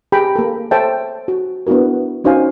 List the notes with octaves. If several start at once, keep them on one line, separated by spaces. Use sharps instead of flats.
G4 G#4 G5 A#5 B5
A#3 A4
A4 C5 C#5 E5 G5 A5
F#4
B3 D4 E4 F#4 A#4
C#4 D#4 F#4 C5 F5 G#5